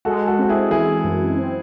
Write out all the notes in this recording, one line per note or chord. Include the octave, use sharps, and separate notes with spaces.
G#3 F#4 A4
F#4 A4
C4 F#4
E4 G#4
E3 E4 G#4
F#2
C4